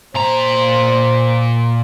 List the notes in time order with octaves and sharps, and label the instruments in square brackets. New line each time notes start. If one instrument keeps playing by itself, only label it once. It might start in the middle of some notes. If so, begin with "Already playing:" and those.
[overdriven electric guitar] A#2 A#5 [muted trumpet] C5